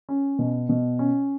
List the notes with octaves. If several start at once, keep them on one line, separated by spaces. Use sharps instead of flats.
C#4
B2
B2
C#4